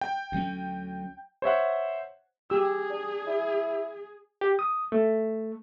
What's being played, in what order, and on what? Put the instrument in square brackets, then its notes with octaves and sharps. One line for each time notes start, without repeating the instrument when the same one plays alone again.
[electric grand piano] G5
[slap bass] D2 F#3 C#4
[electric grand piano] C5 C#5 E5 F#5
[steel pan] G4 E6 [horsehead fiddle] G#4
[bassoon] D4
E4
[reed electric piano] G4
D#6
A3